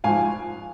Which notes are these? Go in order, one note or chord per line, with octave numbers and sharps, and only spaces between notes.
G#1 G#2 F3 F5 G#5